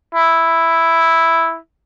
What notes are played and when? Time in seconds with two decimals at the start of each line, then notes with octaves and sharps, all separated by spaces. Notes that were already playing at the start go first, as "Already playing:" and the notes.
0.15 E4